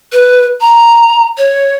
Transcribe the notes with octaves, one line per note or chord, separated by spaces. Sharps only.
B4
A#5
C#5